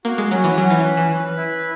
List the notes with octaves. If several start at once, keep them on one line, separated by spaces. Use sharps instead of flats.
A#3 F#4
G#3
F#3 C#4
E3
F#3 C#4
E3
B4
E3
B4
E4